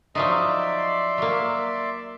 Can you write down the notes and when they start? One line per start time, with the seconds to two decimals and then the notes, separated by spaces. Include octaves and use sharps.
0.15 F3 F#3 D#4 D5 E5 C6
1.18 F#3 A#3